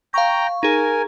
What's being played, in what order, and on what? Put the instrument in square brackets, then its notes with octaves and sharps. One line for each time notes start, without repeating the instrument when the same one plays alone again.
[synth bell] F5 C#6 [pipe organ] G5 A#5
[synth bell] D#4 G#4 [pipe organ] A#4 G#5